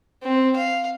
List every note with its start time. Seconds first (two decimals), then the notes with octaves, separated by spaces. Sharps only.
0.23 C4
0.56 F5